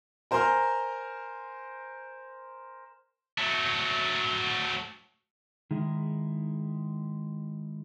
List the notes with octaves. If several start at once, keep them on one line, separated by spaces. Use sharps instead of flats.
A#4 C5 G#5 A#5 C6 F6
F#3 A3
D#3 G#3 E4